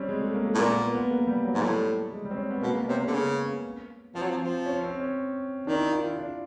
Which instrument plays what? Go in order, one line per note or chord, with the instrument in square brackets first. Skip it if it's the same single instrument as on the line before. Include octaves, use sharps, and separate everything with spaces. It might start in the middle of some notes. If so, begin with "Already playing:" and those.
Already playing: [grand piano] G3 C4 C#4
G#3
A3
A#3
A3
[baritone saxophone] A2
[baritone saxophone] A#2 [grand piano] A#3
[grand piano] B3
B3
A#3
G3
F#3
[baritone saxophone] G#2
[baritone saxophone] A2 [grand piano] G3
[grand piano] G#3
G3
C4
C#4
B3
[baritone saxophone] B2 [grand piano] A#3
[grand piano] B3
[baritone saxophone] C3 [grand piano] C#4
[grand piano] C#4
[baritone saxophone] D3
C#3
[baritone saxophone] F3 [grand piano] C4
[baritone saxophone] F#3
F3
F3
[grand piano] C#4
C4
C#4
[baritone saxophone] D#3 [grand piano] D4
[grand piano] E4
F4
E4
D4